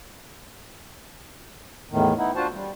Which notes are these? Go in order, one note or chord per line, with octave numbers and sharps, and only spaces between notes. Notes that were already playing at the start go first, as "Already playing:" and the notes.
E2 A2 D#3
B3 D#4 E4
D4 F4 F#4 C5 A5
G3